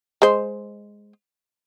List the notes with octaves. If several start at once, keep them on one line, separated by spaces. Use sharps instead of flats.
G#3 C5